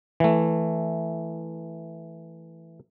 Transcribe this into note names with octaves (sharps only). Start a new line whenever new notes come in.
E3 A3